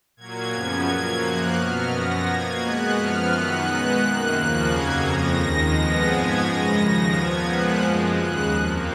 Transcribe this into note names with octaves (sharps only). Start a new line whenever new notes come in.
A#2 F#3 A#3 G#6
F#2 C#3 F3 B3 G#6
A#2 F#3 A#3
F#2 F3 A#3 F#6
B2 F#3 B3 F6
F#2 F3 B3 A#6
B2 A#3 G#6
B2 G#3 B3 F#6
F#2 F3 B3 F6
F#2 D#3 F#3 B3 F#6
B2 G#3 B3
F#2 D#3 A#3
D#2 C#3 F3 A#3 F#6
F2 C#3 F#3 A#3 G#6
F2 C#3 F3 A#6
D#2 D#3 G#3
F2 F3 G#3 B3 A#6
G#2 F3 G#3 B3 G#6
F#2 C#3 G#3 A#6
D#2 C#3 F3 A#6
A#2 F3 B3 G#6
A#2 F3 G#3 B3 F#6
F#2 F3 G#3
D#2 C#3 G#3 F#6
F2 F3 A#3